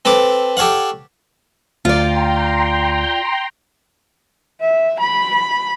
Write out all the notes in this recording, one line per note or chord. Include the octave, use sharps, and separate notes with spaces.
C4 A4 B4 D6
G4 A4 C#5 F5 F#5
D2 F4 D5 G5 A#5 C6
E5
B5